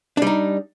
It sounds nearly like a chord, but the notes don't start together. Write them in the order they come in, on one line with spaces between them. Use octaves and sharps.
D4 G3 D#4